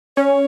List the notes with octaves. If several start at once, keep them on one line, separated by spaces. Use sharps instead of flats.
C#4 C#5